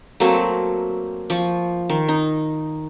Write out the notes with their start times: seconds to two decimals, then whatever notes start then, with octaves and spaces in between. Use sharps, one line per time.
0.20 F#3 A3 A#3 C4
1.30 F3 C#6
1.90 D#3
2.08 D#4